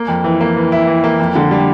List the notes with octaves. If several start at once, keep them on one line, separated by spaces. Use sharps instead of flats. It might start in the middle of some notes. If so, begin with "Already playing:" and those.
Already playing: A#3
F2
E3
A#3
E3
E4
E3
A#3
F2
D3
G3